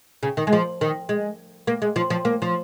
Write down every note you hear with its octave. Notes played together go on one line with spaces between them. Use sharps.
C#3
D#3
G#3
F3
D#3
G#3
A#3
G#3
F3
F3
A#3
F3